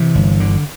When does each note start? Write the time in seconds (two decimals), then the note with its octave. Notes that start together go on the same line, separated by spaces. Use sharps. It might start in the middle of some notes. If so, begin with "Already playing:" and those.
Already playing: C3 E3
0.15 G1
0.40 D3